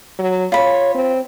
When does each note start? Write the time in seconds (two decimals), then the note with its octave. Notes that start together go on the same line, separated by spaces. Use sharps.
0.19 F#3
0.52 F4 C#5 B5
0.95 C4